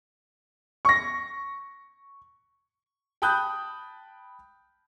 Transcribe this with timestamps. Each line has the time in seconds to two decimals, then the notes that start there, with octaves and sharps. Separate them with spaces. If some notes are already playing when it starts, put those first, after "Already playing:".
0.85 C#6 A#6
3.22 G5 A5 B5 D#6 F#6 G6